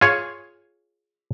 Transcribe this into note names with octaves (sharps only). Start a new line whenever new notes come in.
F4 G#4 C#5